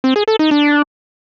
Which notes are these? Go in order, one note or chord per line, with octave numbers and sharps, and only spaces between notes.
C4
G#4
A4
D#4
D4